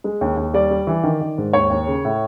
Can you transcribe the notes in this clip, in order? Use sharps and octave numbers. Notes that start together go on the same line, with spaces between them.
G#3
D#2
D#2
G3 D5
G3
E3
D#3
D#3
G#2
D#2 C#5
D#2
C#3
A2